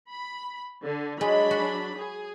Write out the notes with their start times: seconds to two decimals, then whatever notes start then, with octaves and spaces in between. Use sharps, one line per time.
0.11 B5
0.83 D3
1.21 F#3 G#3 D4 B5
1.51 F#4
1.97 G#4